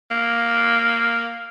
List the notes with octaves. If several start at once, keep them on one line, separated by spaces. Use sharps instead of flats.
A#3